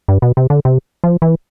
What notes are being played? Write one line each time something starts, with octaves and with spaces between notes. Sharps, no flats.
G2
B2
C3
D3
C3
F3
E3